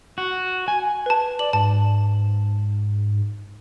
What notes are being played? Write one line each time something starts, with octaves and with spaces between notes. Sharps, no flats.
F#4
G#5
B4 A5
D5 F#7
G#2 A5